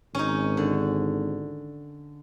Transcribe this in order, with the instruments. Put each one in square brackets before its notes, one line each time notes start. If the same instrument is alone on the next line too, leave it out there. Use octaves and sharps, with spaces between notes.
[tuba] G#1 [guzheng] C#4 D#4
[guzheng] D3